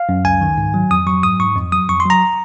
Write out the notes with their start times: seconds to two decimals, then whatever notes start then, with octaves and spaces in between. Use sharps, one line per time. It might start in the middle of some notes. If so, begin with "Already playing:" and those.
Already playing: F5
0.09 F#2
0.25 C#2 G#5
0.41 D#3
0.58 G#2
0.74 F#3
0.90 F2 D#6
1.07 F#3 C#6
1.23 G#2 D#6
1.39 G#2 C#6
1.56 F2
1.72 F#3 D#6
1.89 F2 C#6
2.00 C6
2.05 F#3 A#5